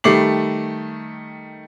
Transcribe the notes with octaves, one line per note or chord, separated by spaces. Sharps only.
D#3 G3 A3 D6 C7 F#7